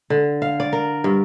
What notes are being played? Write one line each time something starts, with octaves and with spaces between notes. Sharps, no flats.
D3
F5
D5
A#4
G2